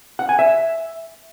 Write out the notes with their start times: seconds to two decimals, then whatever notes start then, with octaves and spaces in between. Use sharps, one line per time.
0.19 F#5
0.29 G#5
0.39 E5